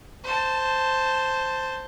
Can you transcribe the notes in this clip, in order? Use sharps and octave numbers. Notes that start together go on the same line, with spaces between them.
C5 A5